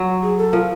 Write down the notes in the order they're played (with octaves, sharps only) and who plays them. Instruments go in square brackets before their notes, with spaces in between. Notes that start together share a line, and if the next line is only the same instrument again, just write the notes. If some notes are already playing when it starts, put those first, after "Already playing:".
Already playing: [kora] F#3
[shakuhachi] G#4
A4
[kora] F3 [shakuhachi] A#4